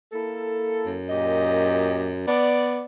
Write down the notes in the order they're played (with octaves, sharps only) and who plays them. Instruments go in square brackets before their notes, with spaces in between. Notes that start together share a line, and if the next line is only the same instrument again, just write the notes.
[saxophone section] A#3 E4 A4
[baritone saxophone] F#2
[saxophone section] A#2 G4 D#5
[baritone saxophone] B3 [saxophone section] D5